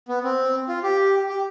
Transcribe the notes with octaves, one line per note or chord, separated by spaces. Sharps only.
B3
C4
F4
G4
G4